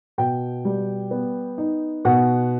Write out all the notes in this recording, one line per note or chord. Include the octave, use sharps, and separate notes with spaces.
B2 G5
G3
B3
D#4
B2 F#5